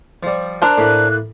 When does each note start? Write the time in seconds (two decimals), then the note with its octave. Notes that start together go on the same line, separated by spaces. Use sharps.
0.23 F3 G3
0.62 D4 A#4 C5 F#6
0.78 A2 A#3 B5